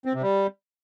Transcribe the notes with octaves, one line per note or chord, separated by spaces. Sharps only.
C4
C3
G3